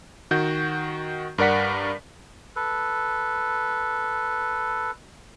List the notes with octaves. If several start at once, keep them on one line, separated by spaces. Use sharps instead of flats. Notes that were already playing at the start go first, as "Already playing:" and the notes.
D#3 F#4 G6
G2 A#4 D5 F#5 B6
A4 B4